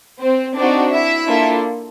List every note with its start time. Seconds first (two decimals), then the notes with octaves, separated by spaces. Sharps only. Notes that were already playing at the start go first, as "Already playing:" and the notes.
0.21 C4 C5
0.57 C4 D4 D#4 F#4 D5
0.93 E4 E5
1.28 A#3 D4 F4 A4